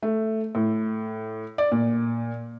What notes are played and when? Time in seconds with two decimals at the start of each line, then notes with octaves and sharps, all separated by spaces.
0.03 A3
0.55 A2
1.58 D5
1.72 A#2